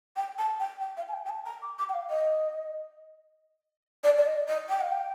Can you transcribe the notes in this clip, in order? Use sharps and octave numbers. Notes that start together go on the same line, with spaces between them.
G5
A5
G5
G5
F5
A5
G5
G5
A5
A#5
D6
D6
G5
F5
D#5
D5
D5
D#5
D#5
G5
F5
G5